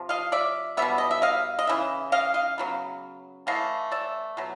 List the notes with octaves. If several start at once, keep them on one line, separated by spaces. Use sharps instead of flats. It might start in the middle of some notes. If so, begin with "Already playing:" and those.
Already playing: C3 F3
D#5 F5
D5 E5
B2 G3 B3 E5
D#5
E5
D#5 F5
D#5
C#3 E3 E5
D#5 F5
D#5 F5
C#3 F#3 B3
E3 A3 D#5 F5
D5 E5
B2 F#3